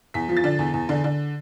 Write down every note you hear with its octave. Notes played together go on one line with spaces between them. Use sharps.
E2 B6
F3
A6
D3
E2
E2
D3
D3